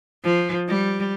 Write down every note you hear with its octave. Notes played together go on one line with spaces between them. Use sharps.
F3
G3